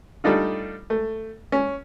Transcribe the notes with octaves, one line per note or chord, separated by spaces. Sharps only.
G3 A3 D4 D#4 F4
A3
C#4